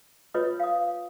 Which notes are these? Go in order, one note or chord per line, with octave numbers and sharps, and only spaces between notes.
F4 B4 C#5 D#5 D#6
F5 D#6